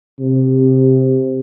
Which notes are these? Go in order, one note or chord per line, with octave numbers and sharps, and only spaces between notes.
C3